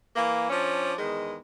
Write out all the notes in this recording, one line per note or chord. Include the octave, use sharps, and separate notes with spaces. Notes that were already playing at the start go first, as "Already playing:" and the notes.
E3 A#3
F3 C#4 D4
E2 D#3 G#3